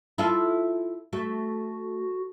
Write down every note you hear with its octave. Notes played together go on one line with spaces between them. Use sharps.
E4 F4 A4
A3 F#4